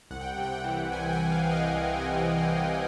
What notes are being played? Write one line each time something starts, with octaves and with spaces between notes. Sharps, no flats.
C2 F#5
G5
F#5
C3 G5
F#5
E3
C2 G#5
G5
C2
F5
C2
D#5
C2
C3
C2
C2